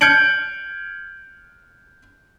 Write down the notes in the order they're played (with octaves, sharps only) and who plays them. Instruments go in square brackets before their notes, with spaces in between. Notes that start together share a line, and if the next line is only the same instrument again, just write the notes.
[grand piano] F6 G6 G#6 C#7 D7 F#7